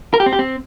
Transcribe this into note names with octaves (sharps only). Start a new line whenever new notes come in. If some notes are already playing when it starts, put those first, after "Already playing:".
A#4
G4
C4
G4
C4